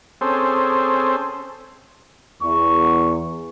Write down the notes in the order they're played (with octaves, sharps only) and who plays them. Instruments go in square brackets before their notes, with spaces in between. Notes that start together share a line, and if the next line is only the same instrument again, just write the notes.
[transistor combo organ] C4 C#4 G#4 A4 C5
[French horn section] E2 [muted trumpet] C#6